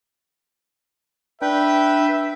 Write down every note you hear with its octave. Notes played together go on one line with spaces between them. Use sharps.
D4 B4 E5 G5